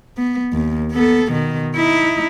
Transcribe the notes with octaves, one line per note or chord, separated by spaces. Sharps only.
B3
D#2
B3 A4
B2 D#3
D#4 E4